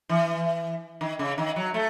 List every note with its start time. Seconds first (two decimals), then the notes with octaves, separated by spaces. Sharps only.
0.09 E3
1.01 D#3
1.19 C#3
1.38 D#3
1.56 F#3
1.74 A3